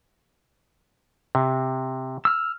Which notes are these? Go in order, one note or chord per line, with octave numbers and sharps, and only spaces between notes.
C3
E6 F6